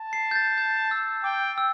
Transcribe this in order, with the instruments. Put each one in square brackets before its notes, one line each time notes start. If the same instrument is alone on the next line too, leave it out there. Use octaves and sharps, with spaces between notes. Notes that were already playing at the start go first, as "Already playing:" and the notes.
Already playing: [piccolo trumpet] A5
[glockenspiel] C7
G6
A6
G6
E6
[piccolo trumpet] G5 [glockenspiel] D6
[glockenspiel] E6